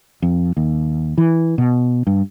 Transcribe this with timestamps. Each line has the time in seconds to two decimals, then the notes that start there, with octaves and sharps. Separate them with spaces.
0.22 F2
0.57 D#2
1.18 E3
1.58 B2
2.07 G2